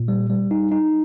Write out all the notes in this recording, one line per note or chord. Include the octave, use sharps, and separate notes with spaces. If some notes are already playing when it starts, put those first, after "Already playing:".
Already playing: A#2
G3
G3
D#4
D#4